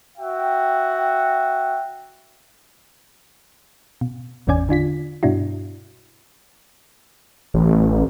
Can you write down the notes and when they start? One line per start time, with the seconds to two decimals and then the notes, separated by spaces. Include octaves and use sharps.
0.18 F#4 E5 G5
4.01 B2
4.47 G#1 E2 B2 C#4 D5 G#5
4.69 D3 D4 F4 B6
5.23 G2 B2 D4 E4 F#4
7.54 A1